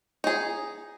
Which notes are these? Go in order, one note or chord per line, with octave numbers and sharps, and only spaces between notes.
D#4 G#4